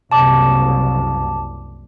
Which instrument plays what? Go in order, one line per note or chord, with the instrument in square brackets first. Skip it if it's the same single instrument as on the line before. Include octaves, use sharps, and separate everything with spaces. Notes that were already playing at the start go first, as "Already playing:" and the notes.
[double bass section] F#1 C2 [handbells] A5 D6